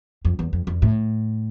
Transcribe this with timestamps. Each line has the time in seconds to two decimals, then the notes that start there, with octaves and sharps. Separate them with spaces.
0.25 F2
0.39 E2
0.53 F2
0.67 F2
0.82 A2